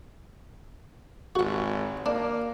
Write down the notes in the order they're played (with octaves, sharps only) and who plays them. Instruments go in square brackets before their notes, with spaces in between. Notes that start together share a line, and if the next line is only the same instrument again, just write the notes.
[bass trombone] G#1 [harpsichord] F#4 F#5
[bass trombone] A#3 [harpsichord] D4